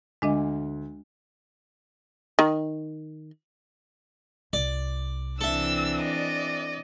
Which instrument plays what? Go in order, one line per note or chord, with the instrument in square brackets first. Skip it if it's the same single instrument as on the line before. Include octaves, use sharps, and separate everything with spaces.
[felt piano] D2 [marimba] G#3 D4 D#5
[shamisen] D#3
[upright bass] C2 [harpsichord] D5
[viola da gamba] E3 C4 D4 [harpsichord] A4 E5 [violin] E6
[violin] D5 D#5